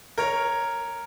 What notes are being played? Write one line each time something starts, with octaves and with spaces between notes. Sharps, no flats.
A#4 C#5